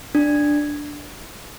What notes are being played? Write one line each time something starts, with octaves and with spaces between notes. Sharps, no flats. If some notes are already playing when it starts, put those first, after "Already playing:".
D4